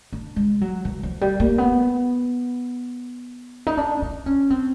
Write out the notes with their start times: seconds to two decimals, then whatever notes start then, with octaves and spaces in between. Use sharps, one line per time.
0.13 D4
0.36 G#3
0.61 F#3
0.85 E3
1.03 F3
1.21 G3
1.40 A#3
1.58 B3
3.67 D#4
3.77 D4
4.02 D4
4.26 C#4
4.50 C4